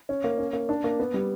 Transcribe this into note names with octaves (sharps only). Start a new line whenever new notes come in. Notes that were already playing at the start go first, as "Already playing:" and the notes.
C#4
A#3
C#4
A#3
D4
A#3
B3
G3